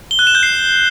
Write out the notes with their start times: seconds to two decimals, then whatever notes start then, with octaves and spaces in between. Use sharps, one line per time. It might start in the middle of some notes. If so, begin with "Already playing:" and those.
0.11 G7
0.19 F#6
0.27 E7
0.35 G6
0.43 C7